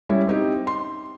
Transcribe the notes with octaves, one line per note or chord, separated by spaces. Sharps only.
G3 C#4 E4
C4 D#4 G4
C6